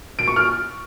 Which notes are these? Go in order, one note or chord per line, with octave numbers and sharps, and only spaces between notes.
D7
C#6
F6